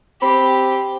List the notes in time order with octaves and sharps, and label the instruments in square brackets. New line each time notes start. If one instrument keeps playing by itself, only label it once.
[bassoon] C4 [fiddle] G4 [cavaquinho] B5